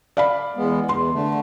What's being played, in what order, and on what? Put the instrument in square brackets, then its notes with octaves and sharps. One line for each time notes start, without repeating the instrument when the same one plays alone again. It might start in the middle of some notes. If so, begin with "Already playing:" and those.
[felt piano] D5 F5 B5
[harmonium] E2 G#3 B3
[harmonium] E2 [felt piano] C6
[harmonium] D3 A3